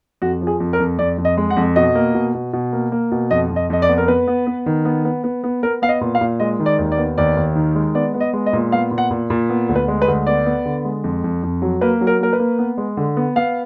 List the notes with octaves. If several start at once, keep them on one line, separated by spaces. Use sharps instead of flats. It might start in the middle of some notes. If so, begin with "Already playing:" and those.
F2 F#4
F3
G#4
F2
A#4
F2
F2 D5
F2
D#5
G#3
F#5
F2
B2 D#5
A#3
B2
B2
B2
A#3
A#3
B2
F2 D#5
F2
D#5
F2 D#5
D5
B3
A#4
B3 B4
B3
B3
D#3
B3
B3
B3
B3
B3 A#4
B3 F5
D#5
A#2
F5
A#2
G#3 D#5
D#3
D5
D#2
D5
B3
D#2 D5
D#2
D#3
G#3
B3 D5
B3
D#5
G#3
D#5
A#2
B3 F5
A#2
F#5
A#2
A#2
B3
D2
B4
G#3
B4
D2
B3 D5
B3
D3
G#3
F2
F2
F2
F#3
A#3 B4
F#3
A#4
A#3 A#4
B4
A#3
B3
G#3
D3
B3
B3 F5